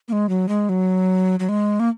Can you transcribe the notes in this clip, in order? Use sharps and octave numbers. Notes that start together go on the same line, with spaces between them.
A#3
G#3
F#3
G#3
F#3
F#3
G#3
A#3